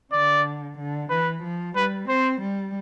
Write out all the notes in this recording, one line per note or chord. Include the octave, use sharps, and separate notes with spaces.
D3 D5
D3
E3 B4
F3
G3 B4
C4 C5
G3